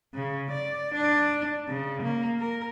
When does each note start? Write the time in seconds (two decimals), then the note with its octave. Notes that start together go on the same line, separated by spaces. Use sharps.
0.14 C#3
0.51 D5
0.94 D4
1.68 C#3
2.02 A#3
2.39 A#4